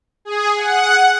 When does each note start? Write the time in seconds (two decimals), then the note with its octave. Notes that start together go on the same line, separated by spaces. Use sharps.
0.25 G#4
0.57 F#5